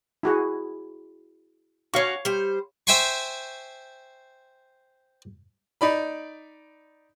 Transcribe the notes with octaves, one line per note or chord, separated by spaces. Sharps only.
E4 F#4 G#4
C#4 F#4 C#5 F5 C#6
G3 C5
C5 E5 G5 G#5 C6 C#6
D#4 D5 B5